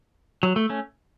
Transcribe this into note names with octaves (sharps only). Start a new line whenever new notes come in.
F#3
A3
A3 C#4